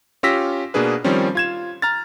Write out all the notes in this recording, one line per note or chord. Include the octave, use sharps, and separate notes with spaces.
C#4 F4 G4 E6 A#6 B6
B2 A#3 D4 G#4 B4
D#3 F3 G3 C4 C#4
F4 G#6 E7
A#5 F6 A6